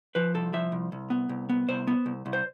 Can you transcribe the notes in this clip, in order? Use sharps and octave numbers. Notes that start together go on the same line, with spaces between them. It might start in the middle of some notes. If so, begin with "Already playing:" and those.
F3 B4
C2 A4
F3 E5
C2
C2
B3
C2
B3
C2 C5
B3
C2
C2
C5